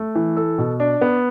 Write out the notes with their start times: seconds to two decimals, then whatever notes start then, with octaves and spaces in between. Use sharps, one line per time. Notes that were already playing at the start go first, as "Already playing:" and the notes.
Already playing: A3
0.15 E3
0.36 A4
0.58 B2
0.80 D4
1.01 B3